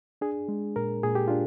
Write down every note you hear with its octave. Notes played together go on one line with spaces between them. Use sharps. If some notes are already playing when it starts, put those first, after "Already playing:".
D4 G#4
G#3
A#2 A#4
A#2 G#4
G4
D4 F4